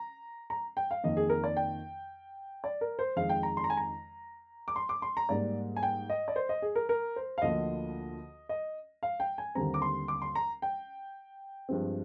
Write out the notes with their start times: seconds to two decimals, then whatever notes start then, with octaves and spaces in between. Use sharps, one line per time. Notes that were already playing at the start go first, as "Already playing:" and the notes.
Already playing: A#5
0.50 A#5
0.77 G5
0.91 F5
1.04 F2 D#3 A#3 D#5
1.17 G#4
1.30 A#4
1.44 D5
1.57 G5
2.64 D5
2.81 A#4
2.99 C5
3.16 F2 D#3 G#3 F5
3.29 G5
3.43 A#5
3.57 C6
3.64 A#5
3.70 G#5
3.77 A#5
4.68 D6
4.76 C6
4.89 D6
5.02 C6
5.17 A#5
5.29 G#2 G3 A#3 D5
5.76 G#5
5.83 G5
6.10 D#5
6.28 D5
6.36 C5
6.49 D#5
6.62 G#4
6.76 A#4
6.89 A#4
7.16 C5
7.38 F5
7.42 D2 D3 F3 A#3 D#5
8.49 D#5
9.03 F5
9.20 G5
9.38 G#5
9.55 D#2 D3 G3 C4 A#5
9.74 D6
9.82 C6
10.08 D6
10.22 C6
10.35 A#5
10.62 G5
11.69 G2 F3 G#3 C4